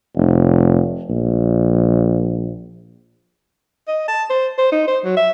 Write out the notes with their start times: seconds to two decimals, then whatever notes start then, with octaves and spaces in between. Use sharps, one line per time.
0.17 F1
1.10 A#1
3.88 D#5
4.08 A5
4.30 C5
4.58 C5
4.72 D#4
4.88 C5
5.04 F#3
5.17 E5